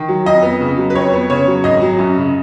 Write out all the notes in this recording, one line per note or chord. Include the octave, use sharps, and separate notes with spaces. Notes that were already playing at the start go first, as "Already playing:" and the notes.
Already playing: D#3
F#3
F2 D#5
B3
C#3
F#3
B4
F2 C#5
B3
C#3 C#5
F#3
G#1 D#5
F#3
F#2
C#3